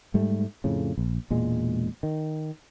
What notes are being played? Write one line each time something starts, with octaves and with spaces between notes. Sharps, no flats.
G#2 G3 A3
F2 A2 C#3
A#1
E1 A#2 G#3
D#3